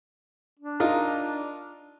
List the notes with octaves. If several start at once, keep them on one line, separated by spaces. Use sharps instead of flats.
D4
D#4 F4 A#4